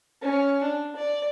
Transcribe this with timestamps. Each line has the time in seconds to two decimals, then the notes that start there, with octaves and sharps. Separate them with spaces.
0.22 C#4
0.63 D4
0.96 D5